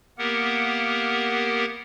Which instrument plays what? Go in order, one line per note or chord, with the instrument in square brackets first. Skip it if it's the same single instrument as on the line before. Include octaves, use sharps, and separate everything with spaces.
[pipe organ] A#3 B3 G4 A#4 F#5